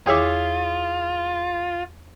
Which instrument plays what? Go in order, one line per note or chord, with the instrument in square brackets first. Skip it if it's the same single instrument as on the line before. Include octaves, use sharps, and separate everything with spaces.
[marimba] E2 E4 D6 [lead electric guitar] F4 [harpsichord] G#4 C#5 E5